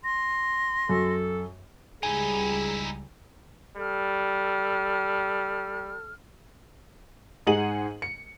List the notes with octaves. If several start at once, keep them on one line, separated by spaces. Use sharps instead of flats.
C6 A#6
F#2 A4
C#2 G3 D#4 E4 G#4 G#5
G3 A4 F6
G#2 D#4 G#4 F#5 D#7 F#7
C#7